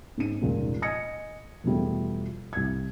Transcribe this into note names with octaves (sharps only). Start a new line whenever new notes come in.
G#2 C#4 D#7
F1 C#2 A#2 D#3
D#5 G#5 D#6 G#6 A#6 C#7
E2 B2 F3 G3 A3
C2 G#6